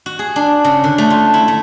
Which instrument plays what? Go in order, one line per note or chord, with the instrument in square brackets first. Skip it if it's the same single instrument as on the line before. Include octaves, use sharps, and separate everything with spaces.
[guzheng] F#4
G#4
D4
C#3
D3
A3
F4
E4
A3